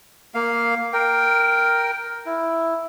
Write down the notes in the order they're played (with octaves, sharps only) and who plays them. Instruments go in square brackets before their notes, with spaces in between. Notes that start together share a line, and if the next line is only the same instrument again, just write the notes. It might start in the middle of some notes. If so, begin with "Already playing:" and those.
[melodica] A#3 F5
A#4 G5
E4